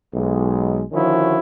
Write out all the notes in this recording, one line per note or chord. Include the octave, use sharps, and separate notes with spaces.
B1 G#3
D3 D#3 F3 C#4 E4 F#4